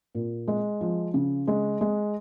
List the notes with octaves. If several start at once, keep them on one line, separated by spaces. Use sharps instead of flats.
A#2
G#3
F3
C#3
G#3
G#3